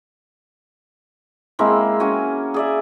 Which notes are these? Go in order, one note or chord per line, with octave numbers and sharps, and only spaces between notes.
G#3 A#3 C4 E4
C#4 F#4 G#5
G#4 D5 E5